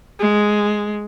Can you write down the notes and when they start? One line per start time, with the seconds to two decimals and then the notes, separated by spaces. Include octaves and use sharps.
0.20 G#3